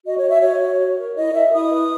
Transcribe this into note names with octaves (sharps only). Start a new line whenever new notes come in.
F#4 D#5
C#5
F#4
E5
F#4 C#5
F#4
C#5
A#4
E4 D#5
A#4 E5
E4 D#6
B4